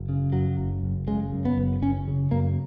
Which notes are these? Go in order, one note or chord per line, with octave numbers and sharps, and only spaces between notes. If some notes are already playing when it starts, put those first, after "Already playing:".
Already playing: F#1
C#3
F#2 F#3
F#1
F#1
C#3 G#3
F#2
B3
F#1
F#1 C#4
C#3
F#2 A#3